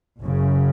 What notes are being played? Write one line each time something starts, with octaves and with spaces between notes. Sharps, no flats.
F#1 F#2 C#3